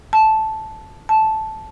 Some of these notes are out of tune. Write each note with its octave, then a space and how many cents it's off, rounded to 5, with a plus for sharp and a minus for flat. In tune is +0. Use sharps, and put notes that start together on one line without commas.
A5 -10
A5 -10